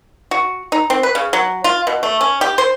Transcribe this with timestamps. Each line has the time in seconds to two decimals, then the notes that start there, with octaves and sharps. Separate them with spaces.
0.31 F#4
0.72 D#4
0.90 C4
1.03 B4
1.15 C#3
1.33 F#3
1.64 F4
1.87 B2
2.03 A3
2.21 C#4
2.41 G4
2.58 C5